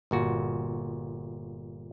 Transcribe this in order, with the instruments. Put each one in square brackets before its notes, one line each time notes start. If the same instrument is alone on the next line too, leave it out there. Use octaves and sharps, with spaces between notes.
[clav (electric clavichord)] G1 A#2 F#4